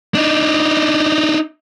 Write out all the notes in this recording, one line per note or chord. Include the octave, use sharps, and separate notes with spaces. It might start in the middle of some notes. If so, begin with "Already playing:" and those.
D4 D#4